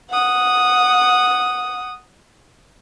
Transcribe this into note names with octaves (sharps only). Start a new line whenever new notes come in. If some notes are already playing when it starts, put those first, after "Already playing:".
F#5 D#6